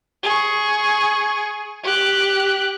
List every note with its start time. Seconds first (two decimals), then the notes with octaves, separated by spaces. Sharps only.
0.23 G#4 C#6
1.84 G4 F#6